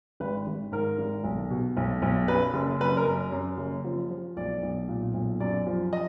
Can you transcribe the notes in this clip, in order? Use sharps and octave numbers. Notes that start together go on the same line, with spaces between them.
G#1 B4
G#1
G#2 A#4
G#1
B1
B2
B1
B1
F#2 B4
F#1
F#2 B4
A#4
F#2
F#2
F#1
F3
F3
B1 D5
B1
A#2
B1
F#2 D5
F3
D#5